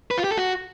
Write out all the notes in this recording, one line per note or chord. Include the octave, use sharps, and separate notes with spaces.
B4
F4
G4
A4
F#4